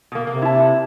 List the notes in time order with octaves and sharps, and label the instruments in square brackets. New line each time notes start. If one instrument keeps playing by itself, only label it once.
[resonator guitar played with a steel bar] B2 A#3
[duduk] C3 [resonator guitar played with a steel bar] A#3
[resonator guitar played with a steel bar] E4 A5